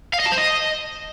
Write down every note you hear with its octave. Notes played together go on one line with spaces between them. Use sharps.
F5
D#5
A5
C5
D#5